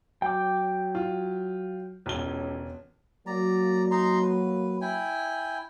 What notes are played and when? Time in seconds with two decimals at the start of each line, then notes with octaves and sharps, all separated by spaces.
0.22 F#3 G5 D6
0.95 F4
2.06 E1 C#2 G7
3.27 F#3 A#3 D5 A#5
3.91 D#4 A#5 C6
4.22 B4
4.81 E4 G5 G#5